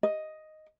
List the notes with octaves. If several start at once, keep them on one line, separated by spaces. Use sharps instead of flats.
D#5